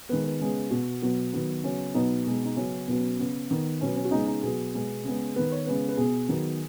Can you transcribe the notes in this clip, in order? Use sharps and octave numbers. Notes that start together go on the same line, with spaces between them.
D#3 G#3 B3 B4
B4
C#3 G#3 B3
B2 B3 F#4
B2 F#3 B3
D#3 F#3 B3
C#3 F#3 B3 C#4
B2 F#3 B3 D#4
B2 G#3 B3
D#4
C#3 F#3 B3 C#4
B2 F#3 B3
C#3 B3
D#3 B3
B2 F#3 B3 C#4
C#4
F#4
C#3 G#3 B3 D#4
D#4
B2 F#3 B3 G#4
B2 G#3 B3
C#3 G#3 B3
D#3 B3 B4
C#5
C#3 G#3 B3 B4
B4
B2 B3 G#4
D#3 F#3 B3